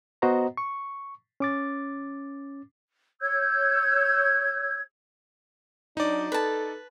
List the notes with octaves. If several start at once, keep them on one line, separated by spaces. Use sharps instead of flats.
B3 F#4 C5 D#5 F#5 A#5
C#6
C#4 D6 A6
C#5 E6 G6 G#6
F#3 D4 D#4 D5
A4 B4 A5